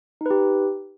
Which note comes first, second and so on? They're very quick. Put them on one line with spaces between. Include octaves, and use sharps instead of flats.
D#4 B4 G4